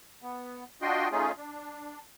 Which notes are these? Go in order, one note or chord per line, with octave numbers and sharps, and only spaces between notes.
B3
D4 F4 F#4 D#5 G5 C6
A3 C#4 D#4 F4 G#4
D4